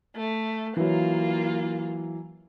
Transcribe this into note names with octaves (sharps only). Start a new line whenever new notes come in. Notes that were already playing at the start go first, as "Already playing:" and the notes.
A3
E3 F#3 A#3 F4